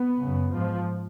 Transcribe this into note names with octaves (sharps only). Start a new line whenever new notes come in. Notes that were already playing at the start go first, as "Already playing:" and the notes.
Already playing: B3
F#2 C#3
G#2 F3